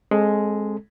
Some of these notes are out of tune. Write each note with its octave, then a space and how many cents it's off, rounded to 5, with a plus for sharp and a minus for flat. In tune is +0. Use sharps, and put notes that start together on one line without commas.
G#3 +0 C4 +30 A4 -10